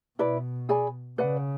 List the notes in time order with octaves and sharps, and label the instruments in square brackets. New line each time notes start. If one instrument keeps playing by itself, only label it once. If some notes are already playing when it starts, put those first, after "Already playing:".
[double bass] B2 [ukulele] E4 B4 D5
[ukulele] G#4 D5 G#5 B5
[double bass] C#3 [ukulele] B4 D5 F#5